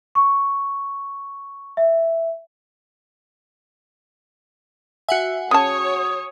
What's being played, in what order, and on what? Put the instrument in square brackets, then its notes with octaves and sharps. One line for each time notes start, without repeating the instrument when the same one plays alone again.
[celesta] C#6
E5
[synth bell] F#4 F#5 G#5 [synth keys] E5
[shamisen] C#3 A5 [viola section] C#5 [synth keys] D#6